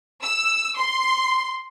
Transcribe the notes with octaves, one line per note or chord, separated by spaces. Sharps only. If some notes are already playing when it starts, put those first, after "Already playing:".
E6
C6